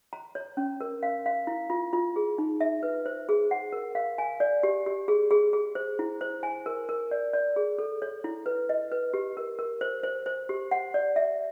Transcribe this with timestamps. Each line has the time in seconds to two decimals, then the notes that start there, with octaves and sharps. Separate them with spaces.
0.13 A#5
0.35 C#5
0.57 C#4
0.81 A#4
1.03 F5
1.26 F5
1.47 E4
1.70 F4
1.93 F4
2.16 G#4
2.38 D#4
2.61 E5
2.83 B4
3.06 C5
3.29 G#4
3.51 F#5
3.73 A#4
3.95 F5
4.18 G#5
4.40 D5
4.63 G4
4.86 G4
5.08 G#4
5.31 G#4
5.53 G#4
5.75 C5
5.99 E4
6.21 C5
6.43 G#5
6.66 A#4
6.89 A#4
7.11 D5
7.33 D5
7.56 G#4
7.78 A4
8.02 C#5
8.24 E4
8.46 B4
8.69 D#5
8.91 B4
9.14 G4
9.37 A#4
9.59 A#4
9.81 C5
10.03 C5
10.26 C5
10.49 G4
10.71 F#5
10.94 D5
11.16 E5